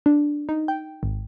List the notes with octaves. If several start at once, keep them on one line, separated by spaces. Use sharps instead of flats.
D4
D#4
G5
G#1